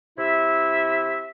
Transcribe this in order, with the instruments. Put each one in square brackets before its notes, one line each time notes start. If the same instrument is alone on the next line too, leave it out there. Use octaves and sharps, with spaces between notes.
[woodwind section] C3 E4 E5